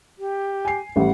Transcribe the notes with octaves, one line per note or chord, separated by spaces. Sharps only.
G4
G#5 C7
A1 G3 F#5